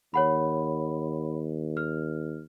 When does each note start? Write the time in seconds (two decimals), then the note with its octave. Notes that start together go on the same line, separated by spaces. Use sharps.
0.14 D#2 C#5 F#5 B5
1.77 F6